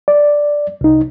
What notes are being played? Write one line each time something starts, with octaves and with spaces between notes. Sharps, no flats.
D5
C2 D#4